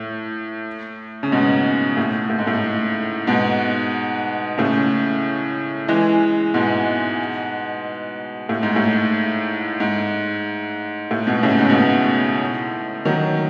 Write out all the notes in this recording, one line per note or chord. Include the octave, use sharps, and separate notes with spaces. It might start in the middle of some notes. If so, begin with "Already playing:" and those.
Already playing: A2
C#3
G#2 B2
A2
A2
G#2
A2
G#2 B2
A2 C#3
E3 G#3
G#2 B2
A2
G#2
A2
G#2
A2
G#2 B2
A2 C#3
G#2
B2
A2
D#3 F#3